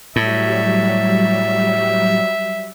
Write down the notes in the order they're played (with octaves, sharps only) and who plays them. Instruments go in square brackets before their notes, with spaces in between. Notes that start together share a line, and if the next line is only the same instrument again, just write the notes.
[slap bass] A2 [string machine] F#3 G3 [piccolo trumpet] E5